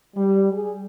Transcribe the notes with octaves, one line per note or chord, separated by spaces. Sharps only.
G3
G#4